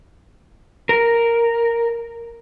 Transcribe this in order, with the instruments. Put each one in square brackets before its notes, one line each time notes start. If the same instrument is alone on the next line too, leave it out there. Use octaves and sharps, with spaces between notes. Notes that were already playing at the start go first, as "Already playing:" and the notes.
[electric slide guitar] A#4